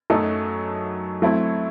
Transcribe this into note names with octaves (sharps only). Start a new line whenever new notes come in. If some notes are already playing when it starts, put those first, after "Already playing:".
F#2 F#3 A3 D#4 A4
F#3 A3 C4 E4